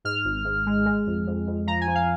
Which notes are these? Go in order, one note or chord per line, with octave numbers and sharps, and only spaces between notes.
G#2 F6
G#1
G#2
G#3
G#3
F2
F2
F2
F3 A#5
G#5
F3
F5